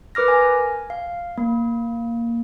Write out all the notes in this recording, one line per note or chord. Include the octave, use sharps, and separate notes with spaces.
A#4 B4 D6 F6 A#6
G#5
F5
A#3